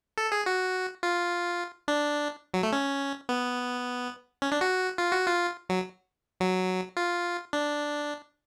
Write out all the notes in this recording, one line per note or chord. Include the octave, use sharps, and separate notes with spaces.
A4
G#4
F#4
F4
D4
F#3
A3
C#4
B3
C#4
D4
F#4
F4
F#4
F4
F#3
F#3
F4
D4